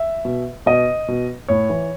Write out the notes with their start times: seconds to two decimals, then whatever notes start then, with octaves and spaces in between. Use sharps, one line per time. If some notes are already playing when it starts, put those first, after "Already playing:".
Already playing: E5
0.25 B2
0.66 B2 D#5
1.08 B2
1.48 A2 C#5
1.69 E3